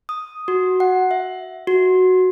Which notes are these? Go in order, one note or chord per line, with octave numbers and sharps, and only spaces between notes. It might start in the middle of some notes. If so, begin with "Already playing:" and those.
D#6
F#4
F#5
E5
F#4